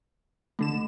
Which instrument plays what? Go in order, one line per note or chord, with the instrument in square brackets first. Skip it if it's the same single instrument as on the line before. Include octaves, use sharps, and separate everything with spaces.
[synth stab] A1 D3 E7 [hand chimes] A3